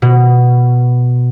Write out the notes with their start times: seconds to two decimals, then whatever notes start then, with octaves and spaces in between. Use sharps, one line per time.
0.02 B2